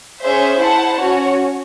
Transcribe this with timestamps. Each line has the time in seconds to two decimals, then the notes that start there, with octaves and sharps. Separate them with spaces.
0.22 C#4 G#4 C5 E5
0.59 E4 C5 F#5 A5
0.98 C#4 F#4 C#5